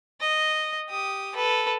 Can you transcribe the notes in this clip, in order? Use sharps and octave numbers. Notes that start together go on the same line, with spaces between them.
D#5
G4 D#6
A4 B4